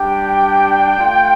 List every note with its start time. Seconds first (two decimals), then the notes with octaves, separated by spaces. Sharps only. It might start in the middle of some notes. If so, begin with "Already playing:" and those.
Already playing: G3 D4 G4 G5
0.94 A3 F4